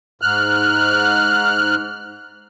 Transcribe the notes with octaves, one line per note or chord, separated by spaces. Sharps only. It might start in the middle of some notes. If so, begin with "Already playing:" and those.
G#2 F6 F#6